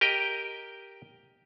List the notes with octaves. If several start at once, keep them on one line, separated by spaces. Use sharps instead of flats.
G4 A#4 D#5 G5